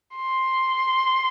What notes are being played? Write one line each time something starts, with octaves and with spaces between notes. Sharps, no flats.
C6